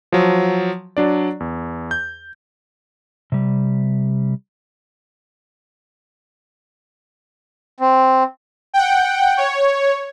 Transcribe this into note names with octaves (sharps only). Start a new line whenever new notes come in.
F3 F#3
F#3 D4 D5
E2
G6
C3 G3
C4
F#5 G5
C#5